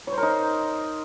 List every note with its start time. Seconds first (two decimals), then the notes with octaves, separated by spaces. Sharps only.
0.07 C#5
0.12 C5
0.17 A#4
0.23 D#4